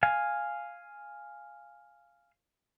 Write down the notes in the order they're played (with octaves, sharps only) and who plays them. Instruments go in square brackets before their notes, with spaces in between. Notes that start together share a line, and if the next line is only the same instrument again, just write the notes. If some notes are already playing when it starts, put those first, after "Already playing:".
[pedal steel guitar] F5 G#5